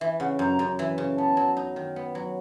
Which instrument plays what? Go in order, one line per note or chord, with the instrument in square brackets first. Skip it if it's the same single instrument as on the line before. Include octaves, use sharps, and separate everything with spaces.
[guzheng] E3 [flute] E5
[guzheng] C#3 [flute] F#5
[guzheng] F#2 [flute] A#5
[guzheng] F#2
E3
C#3
[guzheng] B3 [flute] A5
[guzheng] F#3
D#4
D#3
B3
F#3